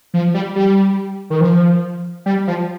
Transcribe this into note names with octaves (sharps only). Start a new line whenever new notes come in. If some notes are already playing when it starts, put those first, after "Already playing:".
F3
G3
G3
D#3
F3
G3
F3